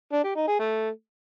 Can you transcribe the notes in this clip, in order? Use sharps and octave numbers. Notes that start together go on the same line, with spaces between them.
D4
G4
D#4
G#4
A3